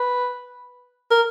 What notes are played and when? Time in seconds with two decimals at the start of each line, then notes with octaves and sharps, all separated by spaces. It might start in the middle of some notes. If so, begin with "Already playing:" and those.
Already playing: B4
1.11 A#4